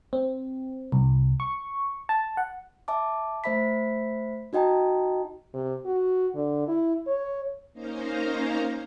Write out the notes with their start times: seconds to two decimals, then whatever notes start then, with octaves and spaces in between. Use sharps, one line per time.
0.13 C4
0.92 C2
1.40 C#6
2.09 A5
2.37 F#5
2.88 E5 A5 D6
3.44 A3 C5 E5 B5 B6
4.53 D#4 F#4 D#5 G5 A5 A#5
5.54 C3
5.85 F#4
6.35 D3
6.68 E4
7.07 C#5
7.73 A#3 C#4 D#4 C5 F5 A#5